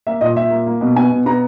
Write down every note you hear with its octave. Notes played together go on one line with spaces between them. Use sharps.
A#3 E5
A#2 D#5
A#2 E5
A#3
A#3
B2
B3 G#5
B2
B3 A#5